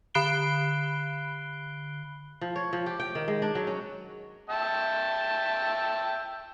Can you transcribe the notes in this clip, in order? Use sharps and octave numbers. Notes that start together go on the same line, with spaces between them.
D3 B5 F#6 C7 D7 G7
F3
C#5
F3
G4
G5
D#3
G#3
D4
F#3
C#4
E5 G5 A5